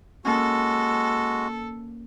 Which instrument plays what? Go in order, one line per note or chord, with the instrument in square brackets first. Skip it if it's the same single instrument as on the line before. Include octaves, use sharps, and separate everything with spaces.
[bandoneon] G#3 F#4 [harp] A#3 C#4 [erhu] A4